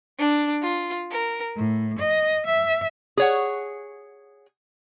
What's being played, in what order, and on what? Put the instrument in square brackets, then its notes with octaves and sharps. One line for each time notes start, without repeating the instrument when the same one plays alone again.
[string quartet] D4
F4
A#4
A2
D#5
E5
[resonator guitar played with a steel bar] G#4 C#5 F#5